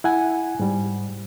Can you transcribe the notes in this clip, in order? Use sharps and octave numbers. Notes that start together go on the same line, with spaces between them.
E4 F#5 G#5
G#2 G3